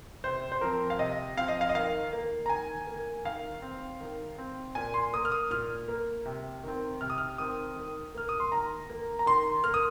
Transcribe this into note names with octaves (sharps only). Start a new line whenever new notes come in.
C3 C5
C5
F3 C4 A#4
F5
C3 D#5
F3 C4 F5
D#5
F5
D#5
D#3 F5
A#3
A#5
D#3 G#5
A#3
D#3 F5
C4
D#3
C4
A#2 G#5
C6
A#3 D#6
F6
D#6
A#2 F6
A#3
C3
D#3 C4
C3 F6
D#6
F6
D#3 C4 D#6
D#3
A#3 F6
D#6
C6
D#3 A#5
A#3
A#5
D#3 C6
A#3 F6
D#6